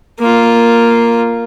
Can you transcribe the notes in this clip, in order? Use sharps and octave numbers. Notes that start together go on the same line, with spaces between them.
A#3 F4